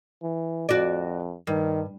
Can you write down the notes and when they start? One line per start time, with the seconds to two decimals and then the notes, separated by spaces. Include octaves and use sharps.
0.22 E3
0.69 F2 F#4 D5
1.47 G2 D#3